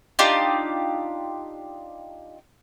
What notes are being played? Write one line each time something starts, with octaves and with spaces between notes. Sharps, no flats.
D4 D#4 F4 G4